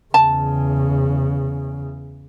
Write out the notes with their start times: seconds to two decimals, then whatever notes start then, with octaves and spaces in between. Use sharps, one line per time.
0.14 E2 C#3 A5